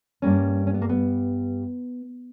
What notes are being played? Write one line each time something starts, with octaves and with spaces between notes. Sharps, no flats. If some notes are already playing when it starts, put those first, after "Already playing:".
G2 G3 A#3 C#4
C#4
B3
A#3
B3